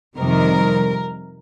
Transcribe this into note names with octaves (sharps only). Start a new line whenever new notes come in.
F2 C3 D#3 G3 A#4